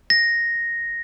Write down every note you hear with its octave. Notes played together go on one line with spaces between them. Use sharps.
A#6